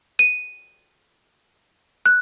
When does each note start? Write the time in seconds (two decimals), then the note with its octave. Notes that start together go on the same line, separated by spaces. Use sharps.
0.19 D#7
2.06 F#6